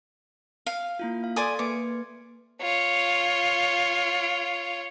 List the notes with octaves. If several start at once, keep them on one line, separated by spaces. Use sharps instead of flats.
F5
A#3 E4 F4
F5
A4 D5 G#5 C6 D#6 G#6
A#3 B4 D6 C#7
F4 C#5